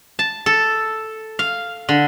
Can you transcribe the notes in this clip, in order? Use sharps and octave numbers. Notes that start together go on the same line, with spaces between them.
A5
A4
F5
D3